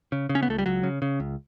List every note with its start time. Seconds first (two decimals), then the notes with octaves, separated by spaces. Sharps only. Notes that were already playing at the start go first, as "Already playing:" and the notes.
0.12 C#3
0.29 C#3
0.35 C#4
0.43 B3
0.48 C#2 A3
0.58 G3
0.66 C#2 F#3
0.83 C#3
1.02 C#3
1.20 C#2